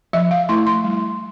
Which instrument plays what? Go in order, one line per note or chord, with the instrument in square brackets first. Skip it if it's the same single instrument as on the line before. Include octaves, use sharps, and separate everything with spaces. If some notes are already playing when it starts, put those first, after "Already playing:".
[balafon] F3 E5
F5
A3 E4 C6
C6
G3